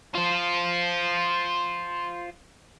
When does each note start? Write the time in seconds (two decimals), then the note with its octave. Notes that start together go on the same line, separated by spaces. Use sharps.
0.15 F4 C5